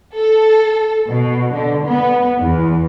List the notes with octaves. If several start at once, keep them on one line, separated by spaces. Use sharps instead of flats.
A4
B2
D3
B3
E2